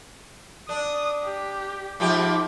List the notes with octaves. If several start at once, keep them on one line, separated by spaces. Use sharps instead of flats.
D4 D#6
G4
G#2 F3 G4 D6